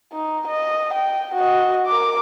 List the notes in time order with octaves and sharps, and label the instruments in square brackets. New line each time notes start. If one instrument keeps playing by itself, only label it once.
[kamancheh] D#4
D#5
G5
F#4 D#5
A#4 D6